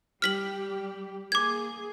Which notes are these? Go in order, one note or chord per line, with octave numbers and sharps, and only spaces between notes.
G3 G4 F6 B6 F#7
A#3 G#4 D6 G#6